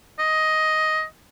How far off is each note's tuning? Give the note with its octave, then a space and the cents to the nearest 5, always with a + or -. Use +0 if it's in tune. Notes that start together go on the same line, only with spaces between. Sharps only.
D#5 +10